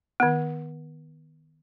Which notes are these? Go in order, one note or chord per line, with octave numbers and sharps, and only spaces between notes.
D#3 B3